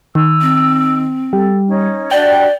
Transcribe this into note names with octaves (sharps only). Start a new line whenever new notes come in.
D#3 E6
C4
G3 A4
C#4 D#4
D4 F#4 D5 E5 G5